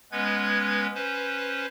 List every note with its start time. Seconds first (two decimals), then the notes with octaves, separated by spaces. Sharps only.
0.12 G#3 B3 C#4 B4 G#6
0.94 C#4 B4 C5